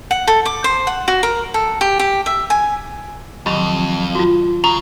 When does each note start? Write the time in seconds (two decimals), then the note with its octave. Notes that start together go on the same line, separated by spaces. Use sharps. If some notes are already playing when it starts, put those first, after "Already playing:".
0.11 F#5
0.27 A4
0.45 D6
0.64 C5
0.87 F#5
1.08 F#4
1.23 A#4
1.54 A4
1.81 G4
1.99 G4
2.26 E5
2.50 G#5
3.46 F2 D#3 F#3 G4 D#5 B5
4.15 F4 F#4
4.64 C#3 A#5